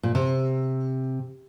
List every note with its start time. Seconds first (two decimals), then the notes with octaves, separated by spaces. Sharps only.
0.03 A#2
0.15 C3